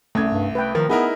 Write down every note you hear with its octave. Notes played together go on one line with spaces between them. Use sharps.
C2 A3 C#4 G#6
G2
A3 B4 G5
D#3 F3 A#4
B3 D#4 E4 G#4 A#4